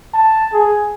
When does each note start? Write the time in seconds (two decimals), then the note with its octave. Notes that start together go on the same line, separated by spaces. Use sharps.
0.14 A5
0.53 G#4